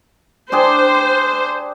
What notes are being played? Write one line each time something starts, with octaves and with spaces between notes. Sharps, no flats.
D4 G4 G#4 C5